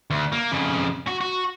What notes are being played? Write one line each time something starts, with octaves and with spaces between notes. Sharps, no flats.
D2
A#3
F2 C#3
F#4
F#4